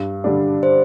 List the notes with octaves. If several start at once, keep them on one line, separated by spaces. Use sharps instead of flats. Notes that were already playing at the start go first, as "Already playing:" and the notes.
Already playing: G2
D3 G3 D4
C5